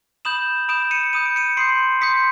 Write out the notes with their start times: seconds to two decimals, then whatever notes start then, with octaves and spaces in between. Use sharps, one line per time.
0.25 B5 D#6 G6 E7 F#7
0.68 B5 D#6 G6 D7 E7
0.91 C#7 D#7
1.13 B5 D#6 G6 D#7
1.25 D7
1.36 C#7 D#7
1.57 C6 D#6 G6 C7 D7
2.01 C6 D#6 G6 B6 C#7